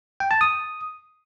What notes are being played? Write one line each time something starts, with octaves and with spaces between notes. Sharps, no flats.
G5
A5
D#6